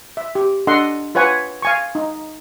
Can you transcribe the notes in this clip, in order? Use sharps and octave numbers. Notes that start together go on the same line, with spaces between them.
E5
G4
D4 A4 D#5 F#5 C6
F4 B4 C#5 F#5 G#5
F5 G#5 C#6
D#4